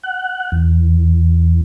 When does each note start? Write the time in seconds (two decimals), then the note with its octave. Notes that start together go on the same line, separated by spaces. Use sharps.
0.03 F#5
0.52 E2